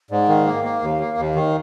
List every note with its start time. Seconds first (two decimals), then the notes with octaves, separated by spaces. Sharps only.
0.11 G#2 D5
0.22 G5
0.28 D#3 F5
0.46 A#3
0.64 A#3
0.82 D#2
1.00 A#3
1.18 D#2
1.35 D#3